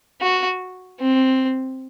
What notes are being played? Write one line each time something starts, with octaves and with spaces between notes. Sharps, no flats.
F#4
C4